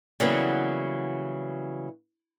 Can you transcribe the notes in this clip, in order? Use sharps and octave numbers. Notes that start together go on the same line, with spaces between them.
C#3 E3 F#3 G3 A#3 B3